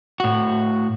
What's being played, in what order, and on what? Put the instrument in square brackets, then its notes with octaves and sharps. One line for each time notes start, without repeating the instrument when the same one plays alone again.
[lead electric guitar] A2 F#4